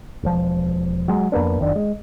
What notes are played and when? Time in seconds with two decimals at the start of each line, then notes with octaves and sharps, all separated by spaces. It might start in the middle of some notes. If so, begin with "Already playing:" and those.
0.23 E1 F3
1.08 F#3 G#3
1.32 F2 A#3 B3 D4
1.59 F#1 D#3 D4
1.76 G#3